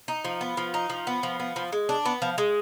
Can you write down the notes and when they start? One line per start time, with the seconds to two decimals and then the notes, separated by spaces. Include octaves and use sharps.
0.08 D#4
0.25 F3
0.41 B3
0.57 F3
0.74 D#4
0.90 F3
1.07 B3
1.23 F3
1.39 B3
1.56 F3
1.72 G#3
1.89 D4
2.06 B3
2.22 F3
2.38 G#3